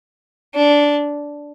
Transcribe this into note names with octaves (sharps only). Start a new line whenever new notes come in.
D4